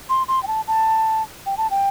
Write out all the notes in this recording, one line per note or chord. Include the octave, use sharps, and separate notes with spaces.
C6
C6
G5
A5
A5
G5
A5
G5